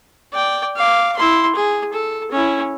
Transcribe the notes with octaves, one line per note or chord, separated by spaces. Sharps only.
D5 G5
F5 D6
E4 C6
G#4
A4
C#4 E4